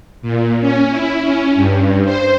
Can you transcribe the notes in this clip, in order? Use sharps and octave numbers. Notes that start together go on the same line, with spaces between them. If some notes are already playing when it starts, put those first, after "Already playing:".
A#2
C#4
E4
C#4
G2
C5